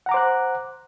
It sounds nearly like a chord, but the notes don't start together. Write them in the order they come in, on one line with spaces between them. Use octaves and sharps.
F#5 A#5 D6 C5 F#6